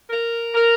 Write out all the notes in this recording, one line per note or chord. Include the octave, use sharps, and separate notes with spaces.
A#4
A#4